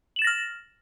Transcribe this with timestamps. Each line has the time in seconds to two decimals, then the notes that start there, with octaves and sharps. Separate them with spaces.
0.16 F#7
0.19 E7
0.22 A6
0.24 A#6
0.27 F6